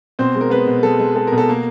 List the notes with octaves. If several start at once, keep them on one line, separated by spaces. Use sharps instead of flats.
B2 C4 C5
G#3
A#4
G#3 B3 B4
B2
G#3 A4
G#3
G#3 A4
A#4
B2
A4
A#3 A#4